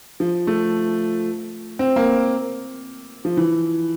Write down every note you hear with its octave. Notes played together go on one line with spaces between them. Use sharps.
F3
A3
C4
A#3
F3
E3